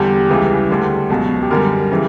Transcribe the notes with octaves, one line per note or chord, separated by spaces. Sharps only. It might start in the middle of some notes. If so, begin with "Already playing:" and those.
Already playing: E2 D3 G3 G4
C#2 C#3 E3 G3
D2 D3 G3
C#2 B2 F#3
G4
F#2 D3 G3 A#4
C#3 E3 G3